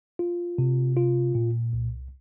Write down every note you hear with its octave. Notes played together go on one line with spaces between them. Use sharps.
F4
C3
F4
A#2
C2